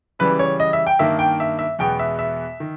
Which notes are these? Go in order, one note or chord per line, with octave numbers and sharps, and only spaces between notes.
C#3 E3 G3 B4
C#5
D#5
E5
G5
G2 D#3 A#3 E5
G5
E5
E5
E2 B2 G#3 B3 G5
E5
E5
D#3